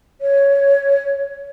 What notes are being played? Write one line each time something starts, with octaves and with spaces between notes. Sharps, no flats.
C#5